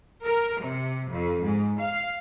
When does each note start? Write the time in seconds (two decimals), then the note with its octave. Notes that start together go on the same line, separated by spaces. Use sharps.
0.23 A#4
0.60 C3
1.08 F2
1.43 G#2
1.79 F5